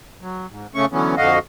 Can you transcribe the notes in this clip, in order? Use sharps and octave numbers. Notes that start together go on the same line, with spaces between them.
F#3
G#2
C#3 A3 C#4 C#6
D3 E3 F#3 B3 C#4
F2 D3 F#4 D#5 F5